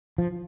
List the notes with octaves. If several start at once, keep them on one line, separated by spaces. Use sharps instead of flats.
F3